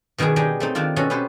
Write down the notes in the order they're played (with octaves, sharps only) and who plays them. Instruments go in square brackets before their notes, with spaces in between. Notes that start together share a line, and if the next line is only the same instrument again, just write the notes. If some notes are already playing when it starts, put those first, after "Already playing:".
[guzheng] B2 D#3 B3 D4 G#4
D4 D#4 G4 G#4 D5 D#5
A3 C4 D#4
D#3 C4 D4 F4
B2 C#4 F#4 A4
B3 C#4 G4 B4 C5